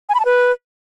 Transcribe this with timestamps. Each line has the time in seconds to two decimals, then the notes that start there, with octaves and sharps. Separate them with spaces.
0.09 G#5
0.14 B5
0.20 A5
0.25 B4